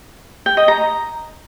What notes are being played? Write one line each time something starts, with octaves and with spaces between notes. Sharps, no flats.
G5
D#5
A#5